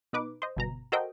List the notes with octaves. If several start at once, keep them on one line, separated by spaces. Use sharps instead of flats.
B2 D#4 B4 D6
C5 D#5
G1 B2 A#5
F#4 A4 A#4 C5 D#5 G5